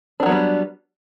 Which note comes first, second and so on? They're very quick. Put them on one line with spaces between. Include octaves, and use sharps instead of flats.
D4 D#3 F#3 B3 G3